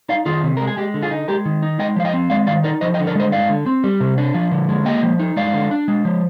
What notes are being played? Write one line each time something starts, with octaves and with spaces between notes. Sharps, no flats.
D#4 D5 F5
D#3 F4 G#4
C3
G#3 A#4
G#4
G#3 G4
D3
F4 G#4
D#4
G#3 G4 A#4
D#3
D#4
G#3 D#5 G5
F3 F5
D#5 G5
C4
G#3 D5 F5
D#3 D5 F5
D#4 A#4 D5
F3 C5 D#5
D#5 G5
D3
A#4 D5
G#3 C5 D#5
G#3 D5 F5
D3
C4
G3
C3
D4
F3
D3
G#3
A#3 D#5 G5
F3
D#4
G#3 D5 F5
D3
D4
G#3
F3